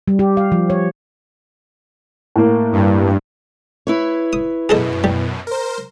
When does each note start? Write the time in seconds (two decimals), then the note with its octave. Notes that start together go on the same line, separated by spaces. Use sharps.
0.08 G3
0.19 G4
0.37 F5
0.52 F3
0.70 C#5
2.36 A2 A#3
2.72 G2
3.87 E4 B4 C#5
4.33 D#6
4.69 F#2 B2 G#4 A4 D#5
5.04 G3
5.47 A#4 C5